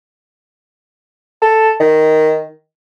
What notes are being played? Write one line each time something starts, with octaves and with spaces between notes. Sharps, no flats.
A4
D#3